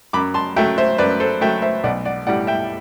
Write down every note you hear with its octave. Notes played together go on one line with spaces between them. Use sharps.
F#2 B5 D6
A5 C6
F#3 A3 E5 G5
C5 E5
F#2 B4 D5
A4 C5
F#3 A3 E5 G5
C5 E5
B1 D5 F#5
D5 F#5
A2 G3 D5 F#5
E5 G5